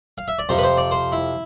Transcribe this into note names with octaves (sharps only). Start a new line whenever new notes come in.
F5
E5
D5
F2 C3 F3 C5
B4
C5
D5
C5
E4